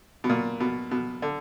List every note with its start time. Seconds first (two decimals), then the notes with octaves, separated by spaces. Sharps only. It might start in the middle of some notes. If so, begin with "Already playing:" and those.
0.24 B2
0.29 A#2
0.60 B2
0.91 B2
1.22 D3